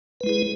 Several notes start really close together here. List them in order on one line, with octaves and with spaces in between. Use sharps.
B4 G#3 E4 G#4